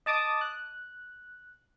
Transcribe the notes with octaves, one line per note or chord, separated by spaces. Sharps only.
D#5 A5 D6 D#6
F#6